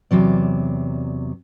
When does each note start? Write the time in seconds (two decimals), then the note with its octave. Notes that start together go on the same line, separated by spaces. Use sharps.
0.11 E2 C3 F#3 D5